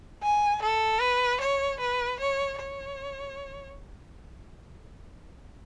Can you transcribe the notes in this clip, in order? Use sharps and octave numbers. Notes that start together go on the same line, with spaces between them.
G#5
A4
B4
C#5
B4
C#5
C#5